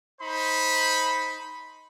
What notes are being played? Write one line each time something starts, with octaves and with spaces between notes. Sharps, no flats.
D#4 C5 B5